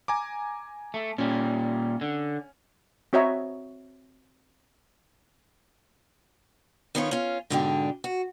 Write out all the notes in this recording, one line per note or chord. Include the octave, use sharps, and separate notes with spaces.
G#5 A#5 D6
A3
A#2 G3 C#4
D3
C4 F#4 C#5 D#5 E5 A#5
D#3 B3 C#4 D#4 F4 C#5
C#4 F4
G#2 B2 D3 D4 F4 G4
F#4